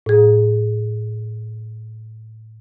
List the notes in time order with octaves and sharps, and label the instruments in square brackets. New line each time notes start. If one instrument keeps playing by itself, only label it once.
[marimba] A2 G#4